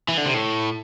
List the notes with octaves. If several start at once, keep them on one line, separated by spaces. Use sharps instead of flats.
E3
D3
C3
A2